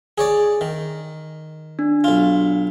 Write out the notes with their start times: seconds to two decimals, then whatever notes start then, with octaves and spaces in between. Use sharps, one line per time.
0.18 G#4 C#5 D5
0.61 D#3
1.79 D4
2.04 B1 F4